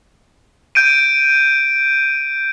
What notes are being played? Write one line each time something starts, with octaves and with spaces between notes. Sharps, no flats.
G6 D7 D#7